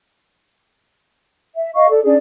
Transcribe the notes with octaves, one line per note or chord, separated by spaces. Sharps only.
E5
D#5 F5 C#6
A4 D5
C#4 D4 G#4 D5